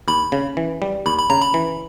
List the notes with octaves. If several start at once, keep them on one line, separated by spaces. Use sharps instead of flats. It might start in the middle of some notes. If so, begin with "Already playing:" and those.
D#2 B5
C#3
E3
G3
D#2 B5
B5
C#3 A#5
B5
E3